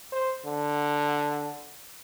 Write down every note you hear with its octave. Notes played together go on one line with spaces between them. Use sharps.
C5
D3